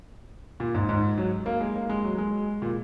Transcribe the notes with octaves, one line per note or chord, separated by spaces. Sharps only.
A#2
G#2
G#2
F#3
A#3
G#3
A#3
G#3
F#3
G#3
A#2